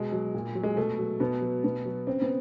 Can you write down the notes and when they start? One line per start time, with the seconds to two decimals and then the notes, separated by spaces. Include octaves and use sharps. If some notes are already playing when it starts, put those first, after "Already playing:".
Already playing: B2 G#3
0.12 F#3
0.34 A#2
0.55 F#3
0.63 G#3
0.77 B2 A3
0.99 F#3
1.20 B2 B3
1.42 F#3
1.64 B2 B3
1.85 F#3
2.07 C#3 C4
2.22 B3